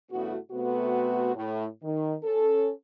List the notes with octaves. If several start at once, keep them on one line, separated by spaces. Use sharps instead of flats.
G2 C#3 A3 B3 E4 F#4
C3 A3 B3 F#4
A2
D#3
C#4 A4